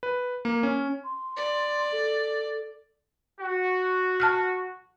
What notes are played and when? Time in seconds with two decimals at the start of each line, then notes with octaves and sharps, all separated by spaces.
0.03 B4
0.45 A#3
0.63 C#4
1.04 C6
1.36 D5
1.92 A4
3.39 F#4
4.20 A5 F6 F#6